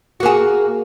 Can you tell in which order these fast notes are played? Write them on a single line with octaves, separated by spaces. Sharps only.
F#4 A#3 G#4